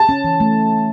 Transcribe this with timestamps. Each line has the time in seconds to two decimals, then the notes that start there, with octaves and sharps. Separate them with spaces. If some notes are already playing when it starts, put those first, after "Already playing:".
Already playing: A5
0.09 C#4
0.24 E3
0.40 A3